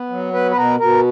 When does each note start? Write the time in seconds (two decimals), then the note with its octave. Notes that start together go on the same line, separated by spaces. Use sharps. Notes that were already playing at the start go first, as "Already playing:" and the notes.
Already playing: B3
0.10 F#3
0.33 B3 B4
0.51 B4
0.56 B2 A#4
0.79 B2 A#4